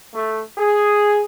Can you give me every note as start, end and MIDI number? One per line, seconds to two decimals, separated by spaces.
0.14 0.41 57
0.58 1.22 68